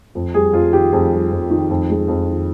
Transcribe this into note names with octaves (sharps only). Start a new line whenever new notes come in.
F2
G3 G#4
F2 F4
D#3 G4
F2 G#4
G3
F2
D#3
F2
G#3
F2
D#3